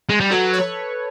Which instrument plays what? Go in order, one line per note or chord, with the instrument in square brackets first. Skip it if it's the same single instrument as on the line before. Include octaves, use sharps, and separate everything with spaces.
[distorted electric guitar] G#3
G3
[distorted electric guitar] F#3 [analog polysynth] A4 B4
[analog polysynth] B4 C#5